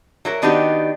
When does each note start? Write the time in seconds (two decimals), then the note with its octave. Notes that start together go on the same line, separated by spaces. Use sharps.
0.25 F#3 E4 A#4
0.42 D#3 B3 D4 D#4 F#4 G4